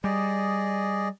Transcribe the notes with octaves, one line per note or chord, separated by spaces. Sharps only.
G3 G#4 D5 D#5